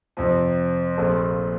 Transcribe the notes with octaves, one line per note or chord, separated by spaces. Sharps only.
F2 C3 F3 C4
A#1 A#2 A3 C4